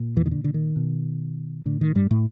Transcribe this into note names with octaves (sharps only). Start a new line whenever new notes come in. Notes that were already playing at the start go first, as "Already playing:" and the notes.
Already playing: A#2
E2 E3
D#3
D3
D3
D#3
B2
A2 D3
D#3
G2 G3
A2 A3